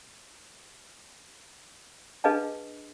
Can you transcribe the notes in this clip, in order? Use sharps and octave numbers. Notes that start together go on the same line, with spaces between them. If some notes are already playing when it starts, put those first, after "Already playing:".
D4 G#4 B4 D#5 F5 A5